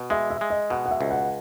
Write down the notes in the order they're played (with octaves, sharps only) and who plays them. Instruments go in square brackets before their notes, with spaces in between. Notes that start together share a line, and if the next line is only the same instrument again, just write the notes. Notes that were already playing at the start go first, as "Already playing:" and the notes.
Already playing: [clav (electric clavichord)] B2
[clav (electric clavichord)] G#3 [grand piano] E5
[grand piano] E5
[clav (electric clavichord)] G#3
[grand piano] D#5
[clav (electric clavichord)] B2 [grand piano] F#5
[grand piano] F#5
E5
[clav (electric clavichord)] C#2
[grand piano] F#5